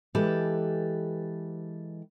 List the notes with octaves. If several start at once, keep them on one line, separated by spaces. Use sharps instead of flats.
E3 G#3 G4 A4 B4